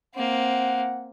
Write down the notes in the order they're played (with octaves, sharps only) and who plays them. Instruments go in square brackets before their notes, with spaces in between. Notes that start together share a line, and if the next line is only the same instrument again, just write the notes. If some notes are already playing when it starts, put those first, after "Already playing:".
[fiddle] A#3 C4 [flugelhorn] F#5